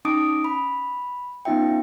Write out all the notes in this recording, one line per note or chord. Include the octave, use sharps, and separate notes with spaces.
C#4 D#4 D6 D#6 D7
B5
B3 C#4 D#4 F4 E5 G5